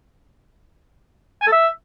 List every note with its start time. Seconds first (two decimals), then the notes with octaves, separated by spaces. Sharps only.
1.42 G#5
1.47 A4
1.52 E5